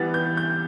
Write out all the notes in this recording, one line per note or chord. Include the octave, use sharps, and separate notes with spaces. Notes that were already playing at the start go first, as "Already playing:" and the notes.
Already playing: E3 G3 B3 A6
G6
G6